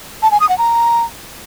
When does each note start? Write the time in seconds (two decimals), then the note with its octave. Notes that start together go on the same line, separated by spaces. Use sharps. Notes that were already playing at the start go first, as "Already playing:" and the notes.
0.22 A5
0.31 G#5
0.40 D#6
0.49 F#5
0.58 A#5